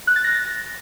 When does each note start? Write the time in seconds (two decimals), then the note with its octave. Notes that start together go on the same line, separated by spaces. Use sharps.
0.07 F#6
0.16 A6
0.24 A#6